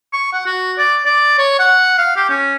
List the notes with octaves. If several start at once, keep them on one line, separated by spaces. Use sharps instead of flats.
C#6
F#5
F#4
D5
D5
C#5
F#5
F5
G4
C#4